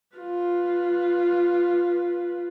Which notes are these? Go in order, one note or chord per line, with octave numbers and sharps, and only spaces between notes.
F4 B4